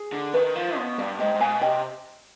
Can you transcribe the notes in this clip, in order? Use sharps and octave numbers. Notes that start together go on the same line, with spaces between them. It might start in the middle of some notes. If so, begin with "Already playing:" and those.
Already playing: G#4
D3
D#3 B4
F3
B2
G2 D5 F5
G#2 D#5 G5
G#2
B2 F5 G#5
C3 D#5 G5